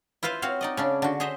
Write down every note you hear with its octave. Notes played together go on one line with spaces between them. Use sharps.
E4 F4 B4 C5 F5
C4 F#4 C#5 F5
D#4 D5 D#5
C#3 C#4 D4
D3 F#4
G#4 C5 C#5 D#5 E5